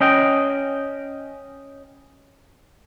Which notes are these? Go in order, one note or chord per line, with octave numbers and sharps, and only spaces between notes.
C#4 D#5 G5